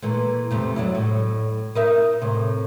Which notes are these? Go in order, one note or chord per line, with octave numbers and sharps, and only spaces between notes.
A#2 E3 A3
F2 C3 A3
F#3 D4 E4
A2
D#4 A#4 E5
A2 C3